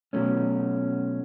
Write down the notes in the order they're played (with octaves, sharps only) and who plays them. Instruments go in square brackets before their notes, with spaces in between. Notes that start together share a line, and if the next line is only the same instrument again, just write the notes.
[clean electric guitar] B2 F#3 A3 C#4